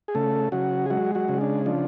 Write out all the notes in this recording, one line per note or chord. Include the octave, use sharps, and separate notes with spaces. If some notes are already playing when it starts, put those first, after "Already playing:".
G#4
C#3 A3 A4
C#3 F#3 F#4
G#4
F#3 G#3 F#4
F#3 F#4
C#3
D4
F3 D4